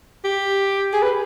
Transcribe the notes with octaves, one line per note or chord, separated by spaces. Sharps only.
G4
G#4
B4